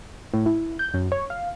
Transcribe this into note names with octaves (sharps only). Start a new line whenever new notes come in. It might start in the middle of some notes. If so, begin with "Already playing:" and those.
A2
E4
G6
F#2
C#5
F5